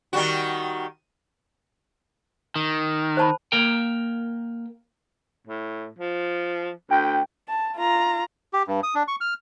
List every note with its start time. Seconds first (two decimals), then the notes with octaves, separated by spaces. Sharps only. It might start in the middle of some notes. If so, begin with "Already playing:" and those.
0.13 D#3 G3 F#4
2.56 D#3
3.17 C5 A5 B5
3.52 A#3 A#4 G5
5.47 A2
5.99 F3
6.91 D2 G5
7.49 A5
7.77 F4 A#5
8.53 G4
8.67 G2
8.83 D#6
8.95 D4
9.08 C#6
9.21 F6